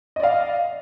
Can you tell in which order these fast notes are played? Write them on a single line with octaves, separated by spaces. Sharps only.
D#5 D5 F5